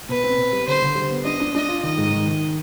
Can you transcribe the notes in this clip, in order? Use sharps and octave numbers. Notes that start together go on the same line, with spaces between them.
B2 B4
C4
B2
G3
D3 C5
D3
G3
B3
D4 D#5
D4
D4 D#5
F4
D#3 D#5
G#2
D#3
D#3